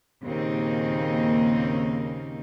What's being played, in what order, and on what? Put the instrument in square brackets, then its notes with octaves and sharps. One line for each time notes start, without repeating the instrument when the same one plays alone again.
[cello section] D#2 A#2 C#3 A#3 C4 D#4